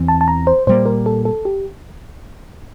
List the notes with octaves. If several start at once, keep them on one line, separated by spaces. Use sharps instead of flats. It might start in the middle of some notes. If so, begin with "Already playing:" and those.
Already playing: E2 E3 C4
A5
A5
A#5
C5
A#2 G3 A#3 C5
A#4
A4
A4
G4